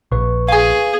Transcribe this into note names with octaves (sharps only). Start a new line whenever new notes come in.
A#1 B4 C#6
G#4 F5 G#5